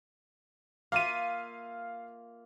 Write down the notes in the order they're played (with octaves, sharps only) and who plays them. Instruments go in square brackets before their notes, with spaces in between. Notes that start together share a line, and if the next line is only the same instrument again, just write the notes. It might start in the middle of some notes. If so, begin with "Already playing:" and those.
[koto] A#3 F4 E5 [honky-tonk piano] F5 D#7